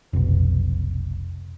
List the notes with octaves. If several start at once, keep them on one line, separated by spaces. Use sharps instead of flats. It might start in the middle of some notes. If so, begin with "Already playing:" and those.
F1 B1